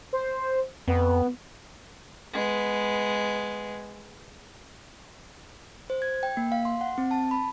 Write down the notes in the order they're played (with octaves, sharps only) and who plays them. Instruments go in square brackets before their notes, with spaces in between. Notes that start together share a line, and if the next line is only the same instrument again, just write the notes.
[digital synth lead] C5
[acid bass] F2 [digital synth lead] B3
[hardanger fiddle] G#3 B3
[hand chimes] C5
G#6
G5
A#3
F5
C6
F#5
C4
A5
B5